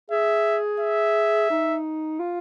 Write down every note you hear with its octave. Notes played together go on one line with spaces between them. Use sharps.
G#4 E5
E5
D#4
F4